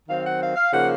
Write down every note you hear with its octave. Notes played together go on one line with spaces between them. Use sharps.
D#3 F#3 C4 F5
F#5
F5
F5
C#3 F3 A#3 D#4 F#5